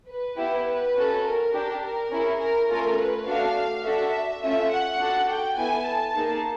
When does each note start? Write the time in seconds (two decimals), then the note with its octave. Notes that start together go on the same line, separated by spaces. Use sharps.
0.08 B4
0.37 B3 E4 G4
0.66 B4
0.95 C#4 F#4 A4
1.24 A#4
1.53 D4 G4
1.82 A#4
2.10 C#4 E4 G#4
2.39 A#4
2.68 A3 C#4 F4 A4 A#4
2.97 B4
3.26 A3 D4 F#4 A4 F5
3.84 D4 F#4 A4 E5
4.41 A3 C#4 F4 E5
4.70 F#5
4.99 D4 F#4 A4
5.28 G5
5.57 B3 E4 A4 G#5
5.85 A5
6.14 A#3 D#4 G#4